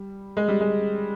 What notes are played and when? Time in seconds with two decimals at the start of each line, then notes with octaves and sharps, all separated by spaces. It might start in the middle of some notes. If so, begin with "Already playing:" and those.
Already playing: G3
0.37 G#3
0.48 G3
0.61 G#3